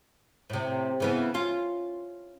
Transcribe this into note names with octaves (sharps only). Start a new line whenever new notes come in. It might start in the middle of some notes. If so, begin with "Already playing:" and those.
A2 C3
C#3 E3 B3
C#4 F4